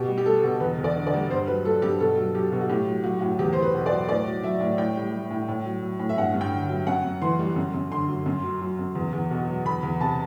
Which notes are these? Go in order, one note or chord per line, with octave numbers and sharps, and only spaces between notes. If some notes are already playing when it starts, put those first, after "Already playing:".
Already playing: B2 G4
G3
G4
G3 A4
B2
E2 B4
E2
D5
D3
D5
G3
G2 C5
F#3 B4
F#3 A4
G2 G4
B2 A4
F#3
F#3 G4
B2
F#4
A2 G4
F#3
F#3 F#4
F#4
A2
E2 G4
E2 C5
B4
B2
D5
F#3
A2 D5
F#3
F#3 E5
A2
A2 G5
G3
G3
A2
A2
F#3
F#3
A2
E5
G2 F#5
G2
G5
D3
F#3
F#2 F#5
F#2
E3 C6
G3
F#2
F#2
D3 C6
F#3
F#2
F#3
F#3
F#2
E2
E2
B2
F#3
E2 B5
E2
C3 A5